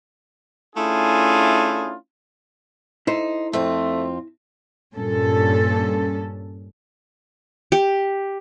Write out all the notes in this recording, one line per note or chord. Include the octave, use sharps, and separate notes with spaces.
A3 C#4 D4 E4 F4 G#4
D#4 E4 A4 C5
F2 A3 C4 F4
G2 A#2 C#4 A4
G4